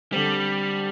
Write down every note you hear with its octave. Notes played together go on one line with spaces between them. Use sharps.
D3 G3 C4 A4 C5